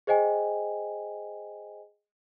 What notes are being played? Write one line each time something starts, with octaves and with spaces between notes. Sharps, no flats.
G#4 C5 D#5 G5 G#5